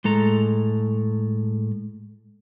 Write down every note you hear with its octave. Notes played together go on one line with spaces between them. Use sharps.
A2 G#3 A4 A#5